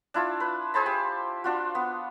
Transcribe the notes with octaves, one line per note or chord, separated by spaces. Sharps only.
D4 E4 F4 A5
B4
G#4 C5 A5 B5
G4
D4 F4 F#4
B3